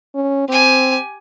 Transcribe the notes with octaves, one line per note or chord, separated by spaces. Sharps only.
C#4
C4 G4 G#5